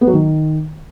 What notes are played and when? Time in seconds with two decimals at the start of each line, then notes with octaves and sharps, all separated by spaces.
0.01 B3
0.07 F#3
0.13 D#3